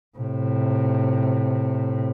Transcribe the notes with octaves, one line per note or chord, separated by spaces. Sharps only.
A2 C3